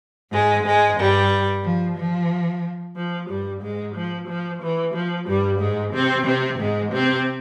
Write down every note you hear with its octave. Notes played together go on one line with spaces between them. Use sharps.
G#2 G#3
G#2 G#3
G2 G3
F3
F3
F3
G2 G3
G#2 G#3
F3
F3
E3
F3
G2 G3
G#2 G#3
C3 C4
C3 C4
G#2 G#3
C3 C4